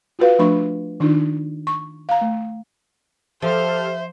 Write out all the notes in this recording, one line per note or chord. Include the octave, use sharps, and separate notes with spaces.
F4 F#4 B4 F5
F3 A3 D4 E5 B5 C#6
D#3 D4 D#4 F4
C#6
F5 A#5
A3
F3 G4 A4 C5 E5 F6